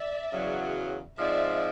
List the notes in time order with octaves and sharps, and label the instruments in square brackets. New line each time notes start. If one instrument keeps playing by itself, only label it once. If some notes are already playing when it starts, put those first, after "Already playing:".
Already playing: [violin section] D5 E5
[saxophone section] E2 C#3 F#3
[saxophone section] G#2 F3 G#3 C4 F4 [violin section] D5 E5